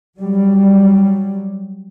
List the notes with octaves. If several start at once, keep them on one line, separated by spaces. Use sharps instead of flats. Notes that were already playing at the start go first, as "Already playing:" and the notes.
F#3 G3